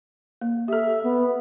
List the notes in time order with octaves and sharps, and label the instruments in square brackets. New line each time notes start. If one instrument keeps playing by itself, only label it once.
[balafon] A#3
[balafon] G4 A4 [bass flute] E5
[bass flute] B3